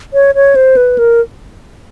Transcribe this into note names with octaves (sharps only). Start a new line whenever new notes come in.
C#5
C#5
C5
B4
A#4